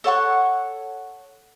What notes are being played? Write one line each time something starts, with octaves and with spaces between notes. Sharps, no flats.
A4 C#5 F#5 C#6